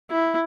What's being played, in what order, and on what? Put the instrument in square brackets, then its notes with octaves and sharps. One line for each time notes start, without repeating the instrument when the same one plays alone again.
[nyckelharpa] E4